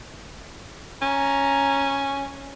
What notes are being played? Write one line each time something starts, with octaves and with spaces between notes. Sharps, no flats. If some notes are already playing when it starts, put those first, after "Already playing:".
C#4 A#5